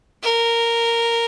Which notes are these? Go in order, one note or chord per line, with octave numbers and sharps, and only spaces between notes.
A#4